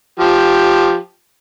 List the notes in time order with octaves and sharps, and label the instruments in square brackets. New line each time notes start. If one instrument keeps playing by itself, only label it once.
[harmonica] F3 G4